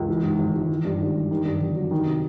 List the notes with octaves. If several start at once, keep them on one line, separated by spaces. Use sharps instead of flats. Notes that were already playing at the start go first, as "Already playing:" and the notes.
Already playing: C#2
E3
G#2
G#1
G#1
E3
G2
G#1
G3
D#3
G2
G1
F#3
D#3
C3